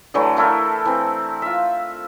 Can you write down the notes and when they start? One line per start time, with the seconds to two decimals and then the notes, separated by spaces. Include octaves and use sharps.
0.14 D3 E3 F#3 A3
0.37 A3 E4 A4 A#4
0.85 E3 C4
1.42 F4 E5